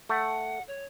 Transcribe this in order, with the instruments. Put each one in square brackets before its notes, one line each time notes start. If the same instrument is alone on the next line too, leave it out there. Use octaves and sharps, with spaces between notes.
[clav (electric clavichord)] A3 [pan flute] F#5
[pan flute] C#5